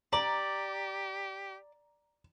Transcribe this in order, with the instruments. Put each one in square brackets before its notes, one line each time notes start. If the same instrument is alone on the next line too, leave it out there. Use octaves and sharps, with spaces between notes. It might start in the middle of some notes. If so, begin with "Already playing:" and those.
[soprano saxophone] G4 [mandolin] D5 [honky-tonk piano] A#5